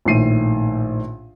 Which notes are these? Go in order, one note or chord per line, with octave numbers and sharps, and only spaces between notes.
A#1 A2 D#3 C7 D#7